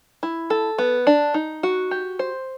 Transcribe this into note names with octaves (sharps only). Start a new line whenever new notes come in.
E4
A4
B3
D4
D#4
F#4
G4
C5